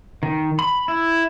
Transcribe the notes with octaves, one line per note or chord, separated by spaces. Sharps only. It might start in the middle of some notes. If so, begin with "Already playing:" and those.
D#3
B5
E4